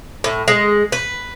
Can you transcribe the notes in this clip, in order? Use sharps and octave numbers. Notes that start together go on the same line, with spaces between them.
A2
G#3
B4